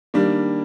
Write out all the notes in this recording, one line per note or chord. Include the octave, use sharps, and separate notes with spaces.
D#3 G3 A#3 D4